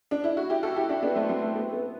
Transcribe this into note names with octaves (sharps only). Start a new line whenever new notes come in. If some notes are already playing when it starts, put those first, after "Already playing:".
D4
E4
F#4
E4 G4
F#4 A4
E4 G4
D4 F#4
B3 D4
A3 C4
A3 C4
A3
B3
B3